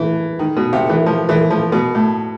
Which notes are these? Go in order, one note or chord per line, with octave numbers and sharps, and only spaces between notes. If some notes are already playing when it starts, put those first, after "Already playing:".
Already playing: E3
D#3
B2
C3
E3
F3
E3
F3
B2
A2